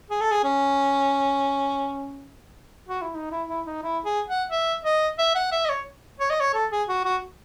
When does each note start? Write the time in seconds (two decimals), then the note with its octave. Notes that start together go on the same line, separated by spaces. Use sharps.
0.10 G#4
0.21 A4
0.31 G#4
0.44 C#4
2.88 F#4
3.02 E4
3.15 D#4
3.32 E4
3.49 E4
3.66 D#4
3.83 E4
4.05 G#4
4.28 F#5
4.50 E5
4.85 D#5
5.19 E5
5.35 F#5
5.52 E5
5.65 D#5
5.70 C#5
6.20 C#5
6.30 D#5
6.40 C#5
6.54 A4
6.71 G#4
6.88 F#4
7.05 F#4